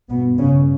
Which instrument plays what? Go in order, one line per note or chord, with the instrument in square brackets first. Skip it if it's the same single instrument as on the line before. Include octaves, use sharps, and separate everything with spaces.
[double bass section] G2 B2 B3
C#3 C#4